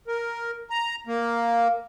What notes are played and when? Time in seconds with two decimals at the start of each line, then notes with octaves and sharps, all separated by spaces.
0.07 A#4
0.70 A#5
1.07 A#3